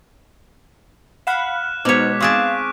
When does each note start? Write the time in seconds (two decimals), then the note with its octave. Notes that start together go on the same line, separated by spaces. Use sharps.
1.27 F5 F#5 B5 F6 F#6 E7
1.85 B2 G#3 B3 D#4 C5 C#5 D6 B6
2.20 C4 G#4 F5 A5 C#6 F#6 D7